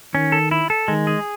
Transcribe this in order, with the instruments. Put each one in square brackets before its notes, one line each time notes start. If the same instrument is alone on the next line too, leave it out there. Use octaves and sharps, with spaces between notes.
[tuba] D#3 [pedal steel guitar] C#4
[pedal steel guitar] A4
E4
A4
[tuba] D#3 [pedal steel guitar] G#3
[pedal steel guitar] G#4